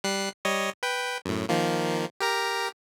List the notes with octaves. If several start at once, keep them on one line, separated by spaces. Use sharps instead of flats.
G3 F#6 C7
G3 C#5 D#5
B4 G5
F#2 A2
D#3 F3 A#3
G4 A#4 A#5